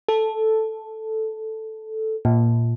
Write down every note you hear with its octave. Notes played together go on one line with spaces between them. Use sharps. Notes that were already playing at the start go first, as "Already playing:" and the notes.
A4
A#2